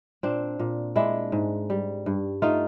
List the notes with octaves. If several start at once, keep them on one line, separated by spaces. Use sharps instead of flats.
A#2 C4 D4
A#2
G#3 D4 E4
G#2
G3
G2
A3 D#4 F4